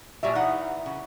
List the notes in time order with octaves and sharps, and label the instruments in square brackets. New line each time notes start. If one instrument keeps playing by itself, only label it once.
[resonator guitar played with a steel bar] A#2 F#3 G3 [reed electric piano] E5
[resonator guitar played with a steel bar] E3 D#4 F#5
C#3